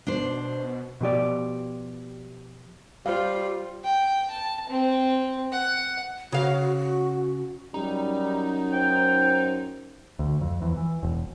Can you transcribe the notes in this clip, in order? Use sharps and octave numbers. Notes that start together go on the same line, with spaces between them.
B2 D4 C5
B2 F3 G4 D5
G3 F4 C5 F5
G5
A5
C4
F#5
C#3 F#4 F5
F#2 G3 D#4
C5 G5
D2
F2
E2
E3
E1